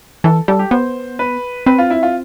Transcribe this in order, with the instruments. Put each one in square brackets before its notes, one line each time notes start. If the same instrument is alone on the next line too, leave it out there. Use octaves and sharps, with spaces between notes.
[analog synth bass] E3 [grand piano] A4
[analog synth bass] G3 [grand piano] A4
[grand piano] G4
[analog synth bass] B3 [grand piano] C5
[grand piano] B4
[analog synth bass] C4 [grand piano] B4
[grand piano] F4
E4
F4